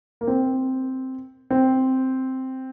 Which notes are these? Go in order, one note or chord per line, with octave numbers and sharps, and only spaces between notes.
A#3
C4
C4